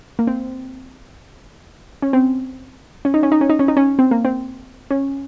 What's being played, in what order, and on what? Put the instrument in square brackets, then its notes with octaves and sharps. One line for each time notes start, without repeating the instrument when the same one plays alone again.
[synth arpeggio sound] A#3
C4
C#4
C4
C#4
D#4
C#4
D#4
C#4
D#4
C#4
D#4
C#4
C4
A#3
C4
C#4